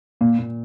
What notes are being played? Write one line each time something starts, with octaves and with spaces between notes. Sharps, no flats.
A#2 A#3
A#2